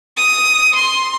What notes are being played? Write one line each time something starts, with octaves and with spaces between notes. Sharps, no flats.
D#6
C6